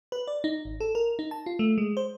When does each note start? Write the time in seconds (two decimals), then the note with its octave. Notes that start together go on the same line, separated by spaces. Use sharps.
0.12 B4
0.27 D5
0.44 D#4
0.65 G#1
0.80 A4
0.95 A#4
1.19 D#4
1.31 A5
1.46 F4
1.59 A3
1.78 G#3
1.97 C5